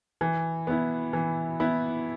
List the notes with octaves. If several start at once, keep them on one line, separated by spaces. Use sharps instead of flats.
E3
B3 E4
E3
B3 E4